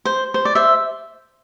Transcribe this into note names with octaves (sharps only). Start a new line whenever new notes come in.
C5
C5
D5
C5 E5